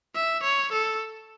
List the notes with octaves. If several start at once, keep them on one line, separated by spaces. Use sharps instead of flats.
E5
C#5
A4